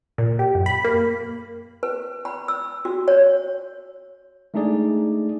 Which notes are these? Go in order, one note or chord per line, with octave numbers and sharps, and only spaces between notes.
A#2
G4
F#2
B5
A#3
B4
B5
E6
F#4
C#5
G#3 A3 D4 D#4 G#4 D5